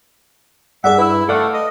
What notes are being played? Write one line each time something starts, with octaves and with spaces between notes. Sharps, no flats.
G2 G#4 D5 E5 F#5
E4 B4 E6
A3 A4 D5 F5 F#5
D#5